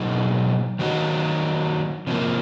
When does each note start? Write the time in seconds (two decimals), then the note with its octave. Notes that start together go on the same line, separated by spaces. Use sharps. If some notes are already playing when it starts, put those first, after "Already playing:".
Already playing: B2 F#3 A#3 D#4 G#4
0.79 D#3 F#3 A#3 D#4 F#4
2.07 C3 F3 A#3